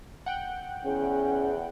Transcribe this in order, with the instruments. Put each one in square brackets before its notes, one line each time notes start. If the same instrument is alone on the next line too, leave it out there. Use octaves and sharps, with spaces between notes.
[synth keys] F#5 G5
[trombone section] E2 [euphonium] C#4 [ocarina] G#4